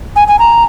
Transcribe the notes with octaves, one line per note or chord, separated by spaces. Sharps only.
G#5
G#5
A#5